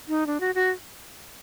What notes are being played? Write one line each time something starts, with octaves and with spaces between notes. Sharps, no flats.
D#4
D4
F#4
F#4